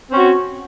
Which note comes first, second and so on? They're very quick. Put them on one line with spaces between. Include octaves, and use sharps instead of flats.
C4 C#4 F#4